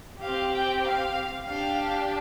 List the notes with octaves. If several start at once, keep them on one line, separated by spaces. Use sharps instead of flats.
C4 G4 F5
G5
F5
D4 G4 F5